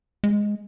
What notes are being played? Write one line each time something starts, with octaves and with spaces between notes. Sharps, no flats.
G#3